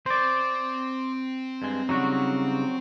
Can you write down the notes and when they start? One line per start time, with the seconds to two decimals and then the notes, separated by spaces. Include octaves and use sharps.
0.06 C4 C5 D5
1.62 G2 G#3
1.89 C#3 F#3 G3 D#4 F#4